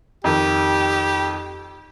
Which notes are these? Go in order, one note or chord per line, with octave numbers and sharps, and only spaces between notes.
F2 D#3 G4